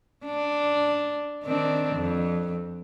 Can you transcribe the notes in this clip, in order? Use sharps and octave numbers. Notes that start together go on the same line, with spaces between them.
D4
D#3 C4 D4
F2